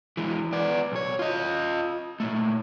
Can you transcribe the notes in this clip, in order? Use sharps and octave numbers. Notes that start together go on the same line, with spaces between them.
E3 G#3
B3 D5
B1 C#5
F4 D#5
A#2 A3